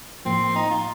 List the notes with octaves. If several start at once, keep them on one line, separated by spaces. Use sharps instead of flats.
A2 F3 A#3 C4
D#4
F4